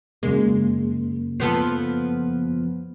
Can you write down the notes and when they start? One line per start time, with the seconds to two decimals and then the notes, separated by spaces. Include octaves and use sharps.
0.23 F#2 C#3 G#3 A#3
1.40 F3 B3 A4